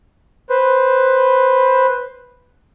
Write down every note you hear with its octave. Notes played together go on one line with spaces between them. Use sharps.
B4 C5